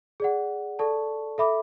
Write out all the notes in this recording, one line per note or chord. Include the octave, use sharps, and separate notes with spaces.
G#4 D5 F#5
A4 D5 A5 C#6
A4 E5 B5 D6